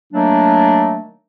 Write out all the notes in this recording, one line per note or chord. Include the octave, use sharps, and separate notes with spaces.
D#3 F#3 A3 A#3 D4